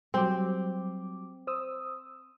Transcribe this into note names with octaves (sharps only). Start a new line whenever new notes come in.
F#3 G3 C4 D6
C5 D#6 E6